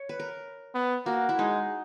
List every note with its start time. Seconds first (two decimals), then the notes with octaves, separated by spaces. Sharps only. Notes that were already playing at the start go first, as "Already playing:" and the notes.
Already playing: C#5
0.09 B4
0.20 A#4
0.74 B3
1.06 A#3 F#4
1.29 E4
1.39 G#3 D#4